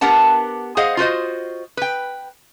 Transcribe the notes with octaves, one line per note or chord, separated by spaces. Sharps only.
B3 D4 G4 A#4 F#5 A5
G#4 C5 D#5 F5 F#5
F4 F#4 C5 D#5
B4 G5